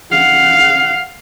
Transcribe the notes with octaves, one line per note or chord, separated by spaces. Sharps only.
F5 F#5